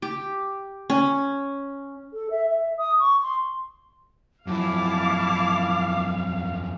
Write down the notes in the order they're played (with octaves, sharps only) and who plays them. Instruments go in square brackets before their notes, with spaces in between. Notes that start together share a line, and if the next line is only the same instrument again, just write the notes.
[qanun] G4
C#4
[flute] A4
E5
E5
D#6
C#6
C6
[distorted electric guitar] F#2 F3 [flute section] E4 A5 D6 [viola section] F5